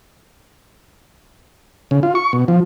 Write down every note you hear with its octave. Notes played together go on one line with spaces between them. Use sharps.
C#3
F4
C#6
B2
F3